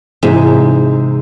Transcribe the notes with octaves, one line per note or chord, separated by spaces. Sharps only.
G#2 C3 E3 C4 D#4 G#4